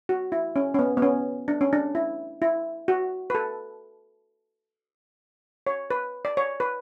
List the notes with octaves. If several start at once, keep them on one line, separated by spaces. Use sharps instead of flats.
F#4
E4
C#4
C#4
B3
B3
C#4
D4
C#4
D4
E4
E4
F#4
B4
A4
C#5
B4
D5
C#5
B4